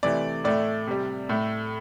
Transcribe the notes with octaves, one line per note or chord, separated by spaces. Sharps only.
C3 E3 A3 D5
A2 A3 D5
C3 G3
A2 A3